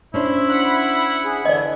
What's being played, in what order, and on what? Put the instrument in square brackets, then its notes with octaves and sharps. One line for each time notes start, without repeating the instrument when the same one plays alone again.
[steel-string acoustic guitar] C#4 D4 C5 [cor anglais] E4
[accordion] F#5 B5
G#4
[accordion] D3 E3 [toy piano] D5 D#5